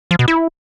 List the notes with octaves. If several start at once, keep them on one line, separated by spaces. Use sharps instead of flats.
F3
B2
E4